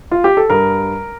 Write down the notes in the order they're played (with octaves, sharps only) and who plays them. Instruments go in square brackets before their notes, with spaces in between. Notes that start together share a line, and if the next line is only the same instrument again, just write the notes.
[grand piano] F4
G4
A4
G2 A#4